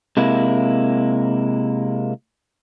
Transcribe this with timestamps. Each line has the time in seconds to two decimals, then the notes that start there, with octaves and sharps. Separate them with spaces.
0.17 C3 G#3 A#3 E4